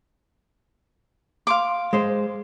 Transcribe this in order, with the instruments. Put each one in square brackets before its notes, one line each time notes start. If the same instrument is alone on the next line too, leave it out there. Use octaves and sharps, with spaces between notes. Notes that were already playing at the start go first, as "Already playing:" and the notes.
[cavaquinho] F5 C6 D6
[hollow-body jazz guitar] G#3 C5